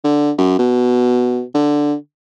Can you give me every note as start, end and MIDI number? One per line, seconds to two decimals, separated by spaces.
0.04 0.32 50
0.38 0.59 42
0.59 1.43 47
1.54 1.95 50